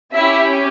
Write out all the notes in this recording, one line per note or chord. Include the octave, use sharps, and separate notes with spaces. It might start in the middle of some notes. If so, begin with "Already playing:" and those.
C#4 E4 G4 E5